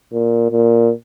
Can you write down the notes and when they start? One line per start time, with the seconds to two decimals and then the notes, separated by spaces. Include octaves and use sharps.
0.13 A#2
0.51 A#2